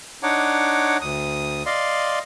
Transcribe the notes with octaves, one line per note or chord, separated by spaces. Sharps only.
D4 D#4 C#5 F#5 D6
D2 D#6
D5 D#5 F5 C6